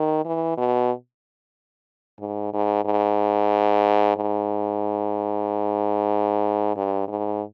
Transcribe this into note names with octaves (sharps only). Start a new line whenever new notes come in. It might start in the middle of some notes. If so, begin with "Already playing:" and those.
Already playing: D#3
E3
B2
G#2
G#2
G#2
G#2
G2
G#2